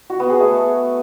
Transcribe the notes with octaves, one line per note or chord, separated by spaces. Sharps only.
F#4
B3
G#4
A3